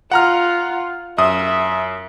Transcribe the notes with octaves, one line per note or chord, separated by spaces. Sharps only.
F4 F#5 A#5 F6
F#2 E5 D#6